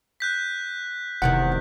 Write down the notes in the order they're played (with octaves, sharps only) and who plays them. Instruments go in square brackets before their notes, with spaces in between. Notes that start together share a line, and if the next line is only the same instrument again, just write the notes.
[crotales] F#6 G6 B6
[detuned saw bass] F1 [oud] E2 C3 D#3 [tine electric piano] F#5